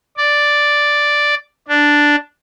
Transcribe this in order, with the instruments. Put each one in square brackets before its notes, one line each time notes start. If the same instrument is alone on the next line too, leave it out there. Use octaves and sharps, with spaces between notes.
[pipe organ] D5
D4